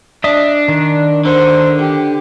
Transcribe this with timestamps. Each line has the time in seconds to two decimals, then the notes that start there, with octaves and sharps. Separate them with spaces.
0.24 D4 D#5 E5 D#6
0.68 D#3
1.25 D3 C5
1.79 G4